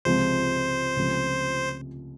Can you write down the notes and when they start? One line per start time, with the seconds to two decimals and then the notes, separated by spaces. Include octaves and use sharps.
0.05 C#2 C3 F3 G#3 C4 C5
0.96 C#2 C3 F3 A3 C#4